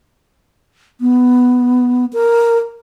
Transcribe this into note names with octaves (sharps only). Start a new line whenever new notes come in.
B3
A#4